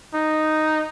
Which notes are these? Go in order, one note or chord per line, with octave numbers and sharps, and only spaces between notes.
D#4